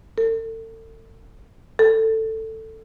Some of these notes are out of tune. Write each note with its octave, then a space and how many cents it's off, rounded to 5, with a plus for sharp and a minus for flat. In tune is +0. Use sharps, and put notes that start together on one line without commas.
A4 +35
A4 +10